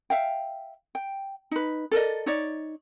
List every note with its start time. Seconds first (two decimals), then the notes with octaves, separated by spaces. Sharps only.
0.10 E5 F5 G5
0.95 G5
1.51 D#4 B4
1.91 A4 A#4 D5 D#5
2.26 D#4 C#5 D5